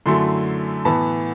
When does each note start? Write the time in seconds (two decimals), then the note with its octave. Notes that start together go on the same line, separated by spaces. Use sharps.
0.06 F#2 D3 F#3 A3 E4 C6
0.85 A2 E3 B3 A5